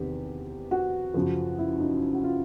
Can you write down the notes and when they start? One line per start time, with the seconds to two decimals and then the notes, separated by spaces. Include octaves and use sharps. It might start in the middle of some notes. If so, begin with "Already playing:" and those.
Already playing: E2 C3 D#3 G4
0.71 F#4
1.14 F#2 C#3 F3
1.59 E4
1.80 D#4
2.14 F#4
2.24 F4